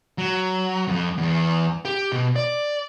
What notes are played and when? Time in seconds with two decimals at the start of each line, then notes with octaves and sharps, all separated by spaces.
0.18 F#3
0.88 F2
1.18 E2
1.85 G4
2.12 B2
2.36 D5